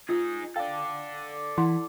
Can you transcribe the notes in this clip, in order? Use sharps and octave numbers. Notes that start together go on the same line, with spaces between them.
D#4 F4 G#4
A4 D5 F5 G5
E3 E4 F#5 C6